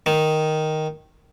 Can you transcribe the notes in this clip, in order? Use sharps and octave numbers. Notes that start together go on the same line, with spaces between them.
D#3